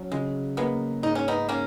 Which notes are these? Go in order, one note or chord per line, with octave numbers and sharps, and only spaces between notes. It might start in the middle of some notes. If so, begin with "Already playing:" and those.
Already playing: F#3 C#4
C#3 G#3
G#3 A#3 B3
G#2 D#4
C#4
B3 D#4
A#3 C#4